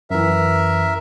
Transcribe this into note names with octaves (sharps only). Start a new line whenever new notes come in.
F#2 E3 A#4 E5